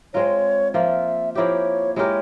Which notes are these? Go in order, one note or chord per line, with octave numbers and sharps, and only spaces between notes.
G#3 C4 F4 A#4 C#5
F3 A#3 F4 E5
F3 A#3 E4 G4 C#5
G#3 E4 G4 A#4 C#5